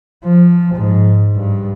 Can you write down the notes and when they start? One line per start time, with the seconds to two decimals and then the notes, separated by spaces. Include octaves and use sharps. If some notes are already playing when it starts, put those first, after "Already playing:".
0.24 F3
0.74 G#2
1.36 G2